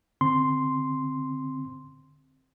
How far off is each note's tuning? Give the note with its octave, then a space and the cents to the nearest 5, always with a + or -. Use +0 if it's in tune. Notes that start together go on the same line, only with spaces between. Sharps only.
D3 +0 C4 +0 C6 +0